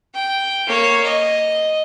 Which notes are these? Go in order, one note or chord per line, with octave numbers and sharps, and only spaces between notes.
G5
A#3 C#5
D#5